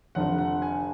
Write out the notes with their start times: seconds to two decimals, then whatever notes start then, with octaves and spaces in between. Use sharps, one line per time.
0.15 F1 F2 D3 F#5
0.38 F#5
0.62 G#5